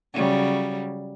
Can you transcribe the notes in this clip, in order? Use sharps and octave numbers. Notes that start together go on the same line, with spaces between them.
C#3 F#3 G3